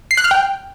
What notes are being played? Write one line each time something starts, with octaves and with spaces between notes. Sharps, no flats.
C7
F#6
F6
G5